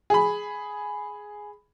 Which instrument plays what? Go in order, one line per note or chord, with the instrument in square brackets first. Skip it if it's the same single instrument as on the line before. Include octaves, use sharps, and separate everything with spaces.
[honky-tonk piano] G#4 B5